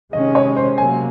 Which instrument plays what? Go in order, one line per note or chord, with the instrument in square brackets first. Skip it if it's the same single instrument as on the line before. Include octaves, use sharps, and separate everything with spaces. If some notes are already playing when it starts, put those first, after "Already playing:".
[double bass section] C3 D#3 G#3 C#4 [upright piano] D#5
[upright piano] C#5
C5
[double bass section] C3 F#3 A#3 [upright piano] G#5